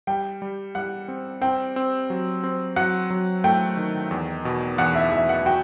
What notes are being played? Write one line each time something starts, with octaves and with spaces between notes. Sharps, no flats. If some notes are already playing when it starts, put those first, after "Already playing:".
G3 G5
G3
G3 F#5
C4
C4 G5
C4
F#3
C4
F#3 F#5
F#3
A3 G5
D#3
E2
B2
E2 F#5
E5
E2 E5
F#5
F#4 G5